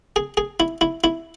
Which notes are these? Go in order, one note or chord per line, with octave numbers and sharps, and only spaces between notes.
G#4
G#4
E4
E4
E4